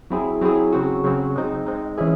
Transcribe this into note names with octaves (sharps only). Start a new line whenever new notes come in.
F#3 C4 E4 G#4
F#3 C4 E4 G#4
C#3 F#3 C4 F#4
C#3 F#3 C4 F#4
G#3 C4 D#4
G#3 C4 D#4
E3 G#3 C#4 E4 G#4